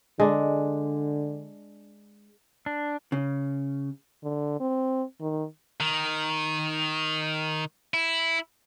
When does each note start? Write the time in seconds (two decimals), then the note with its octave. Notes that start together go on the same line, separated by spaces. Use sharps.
0.20 D3 G#3 D4
2.66 D4
3.12 C#3
4.24 D3
4.60 C4
5.21 D#3
5.80 D#3
7.94 E4